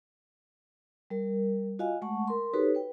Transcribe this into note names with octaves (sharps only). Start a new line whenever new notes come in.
G3 A#4
F4 F#4 D#5 F5 G#5
G#3 A3 F#5 A5 C#6
A#4 C6
D#4 F#4 G4 A4 B4 C#5
B4 G5